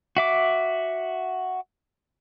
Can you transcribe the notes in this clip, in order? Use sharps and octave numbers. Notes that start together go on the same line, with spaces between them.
F#4 E5 D6